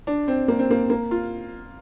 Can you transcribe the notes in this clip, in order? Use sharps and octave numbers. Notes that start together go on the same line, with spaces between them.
D4
C4
A#3
C4
A#3
A#3
F4